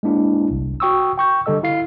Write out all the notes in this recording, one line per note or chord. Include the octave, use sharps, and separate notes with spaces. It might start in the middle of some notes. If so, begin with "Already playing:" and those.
G#3 A#3 D4 E4
G1 C2
F#4 G5 C#6 D#6 E6
G5 C#6 G6
D3 G3 A4 D#5 E6
E4 F5 C7